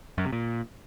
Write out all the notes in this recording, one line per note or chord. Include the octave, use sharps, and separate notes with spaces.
F#2
C3
A#2